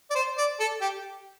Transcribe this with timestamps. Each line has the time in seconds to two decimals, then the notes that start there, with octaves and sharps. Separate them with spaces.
0.10 D5
0.15 C5
0.38 D5
0.60 A4
0.81 G4